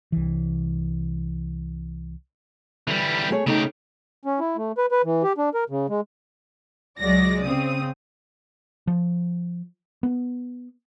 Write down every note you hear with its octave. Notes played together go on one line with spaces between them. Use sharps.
C2 E3
D3 E3 G3
A3 G#4 C#5
C#3 A3 D#4 G4
C#4
E4
A3
B4
B4
E3
G4
D4
A#4
C#3
G#3
C#2 F#3 G#3 D5 A#6
C#3 C4 D#6
F3
B3